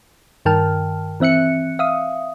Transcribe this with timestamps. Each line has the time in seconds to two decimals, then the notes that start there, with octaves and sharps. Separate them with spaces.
0.45 G2 D#3 A#4 G5 A5 F6
1.20 E3 C4 E5 F#6 C#7
1.79 E5 F5 D#6